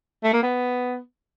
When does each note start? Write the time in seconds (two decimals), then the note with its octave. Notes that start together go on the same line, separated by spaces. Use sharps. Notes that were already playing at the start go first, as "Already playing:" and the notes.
0.24 A3
0.33 A#3
0.43 B3